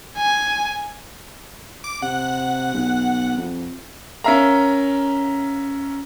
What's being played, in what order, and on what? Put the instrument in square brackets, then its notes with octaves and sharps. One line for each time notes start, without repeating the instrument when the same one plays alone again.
[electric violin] G#5
[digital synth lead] D6
[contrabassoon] C3 [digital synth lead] F#5
[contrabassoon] B1
F2
[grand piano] C#4 A#4 E5 F5 A#5